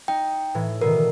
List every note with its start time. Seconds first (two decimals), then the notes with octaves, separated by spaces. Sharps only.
0.08 D#4 G5
0.55 A2 E3
0.82 B2 D3 D#3 A#4